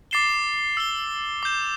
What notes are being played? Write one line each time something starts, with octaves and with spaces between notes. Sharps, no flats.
D6 A6 C7 E7 G7
E6 C7 G7
D6 G6 E7